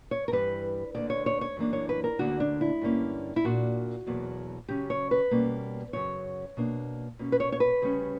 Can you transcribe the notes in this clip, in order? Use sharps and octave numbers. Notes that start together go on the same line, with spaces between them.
C#5
A#4
G2 E3 G3 B4
D2 D3 A#3 D5
C#5
C#5
C#5
F#2 E3 A#3 D4
C#5
B4
A#4
D2 D3 A#3 D4 F#4
D4
E4
G2 D3 A#3 C#4
E4
A#2 A#3 D4 F#4
E2 B2 F#3 A#3
C#3 F#3 C#4 G4
C#5
B4
B2 G3 A#3 C#4
F#2 C#3 F#3 C#5
B2 A#3 D4
B2 A#3 C#4
B4
C#5
C#5
B4
D2 C#3 G3 C#4